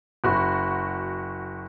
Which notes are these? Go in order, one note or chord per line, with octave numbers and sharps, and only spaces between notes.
F#1 F#4